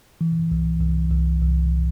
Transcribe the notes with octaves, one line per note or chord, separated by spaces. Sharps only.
E3
C2
C2
C2
C2